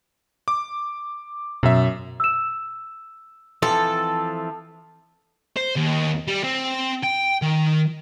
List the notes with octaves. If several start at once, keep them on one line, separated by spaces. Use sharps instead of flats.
D6
F#2 B2 E5
E6 E7
E3 F3 C4 A4
C5
D#2
G3
C4
G5
D#3